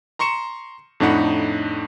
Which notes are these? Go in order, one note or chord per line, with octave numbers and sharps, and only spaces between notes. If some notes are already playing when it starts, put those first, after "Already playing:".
A#5 C6 C#6 C#7 E7
F2 A2 D4 D#4 F#5 B5